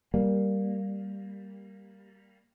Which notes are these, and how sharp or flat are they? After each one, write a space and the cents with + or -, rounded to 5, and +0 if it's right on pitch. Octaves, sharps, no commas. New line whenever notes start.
G3 +0 A#3 +0